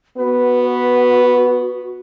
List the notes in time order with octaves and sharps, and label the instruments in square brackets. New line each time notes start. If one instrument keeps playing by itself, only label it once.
[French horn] B3 [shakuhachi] F#4 [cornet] B4
[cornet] B4